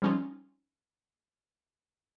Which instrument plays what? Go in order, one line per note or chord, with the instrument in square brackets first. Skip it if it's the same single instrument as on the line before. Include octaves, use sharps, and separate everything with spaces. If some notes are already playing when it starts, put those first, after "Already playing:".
[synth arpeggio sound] F3 G3 C4 C#4 D#4 F4